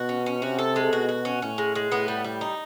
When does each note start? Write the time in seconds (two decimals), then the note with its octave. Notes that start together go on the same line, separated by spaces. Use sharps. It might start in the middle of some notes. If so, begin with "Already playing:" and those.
Already playing: B2 F#4
0.09 C#4
0.26 C#4
0.42 C3 F#4
0.59 A4
0.76 G#3
0.92 B2 F#4
1.09 F#4
1.25 C#4
1.42 A2 C#4
1.58 G#3
1.75 G#3
1.92 A2 B3
2.08 G3
2.24 G3
2.41 D#4